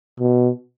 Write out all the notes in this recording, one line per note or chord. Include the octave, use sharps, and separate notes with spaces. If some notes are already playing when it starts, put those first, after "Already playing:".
B2